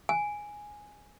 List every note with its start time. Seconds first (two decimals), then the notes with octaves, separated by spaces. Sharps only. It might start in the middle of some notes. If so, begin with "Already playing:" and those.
0.09 G#5